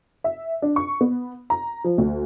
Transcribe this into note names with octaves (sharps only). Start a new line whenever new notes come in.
E5
D4
C#6
B3
A#5
F3
D2